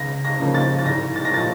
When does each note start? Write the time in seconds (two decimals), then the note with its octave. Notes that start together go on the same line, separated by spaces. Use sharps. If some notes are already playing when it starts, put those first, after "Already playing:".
Already playing: C#2 A#6
0.25 A#6
0.40 C#3 F3 A#3
0.54 A6
0.79 A6
0.85 C2 A#6
1.16 A6
1.25 A#6
1.31 A#2 F3 A6